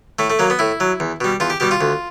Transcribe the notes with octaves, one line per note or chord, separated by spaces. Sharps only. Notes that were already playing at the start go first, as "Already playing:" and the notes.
A2 A3
A3
F#3 A#3
B3
A2 E4
F#3
E2
B2 G3
E2 F4
G4
B2 G3 G4
F4
D2